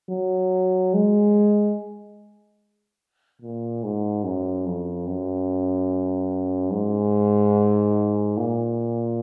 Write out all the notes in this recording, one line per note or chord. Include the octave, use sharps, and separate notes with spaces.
F#3
G#3
A#2
G#2
F#2
F2
F#2
G#2
A#2